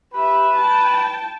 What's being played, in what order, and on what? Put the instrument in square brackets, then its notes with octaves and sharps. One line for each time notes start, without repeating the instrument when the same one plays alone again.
[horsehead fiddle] G4 E5 [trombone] B4
[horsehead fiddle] G5 A5